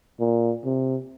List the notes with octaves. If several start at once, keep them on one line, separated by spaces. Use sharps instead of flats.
A#2
C3